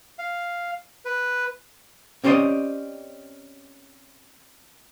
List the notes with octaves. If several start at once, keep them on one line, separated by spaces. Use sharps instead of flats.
F5
B4
C4 C#4 G4 C5 D5 D#5